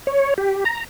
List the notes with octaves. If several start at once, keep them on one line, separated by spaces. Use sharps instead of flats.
C#5
G4
A#5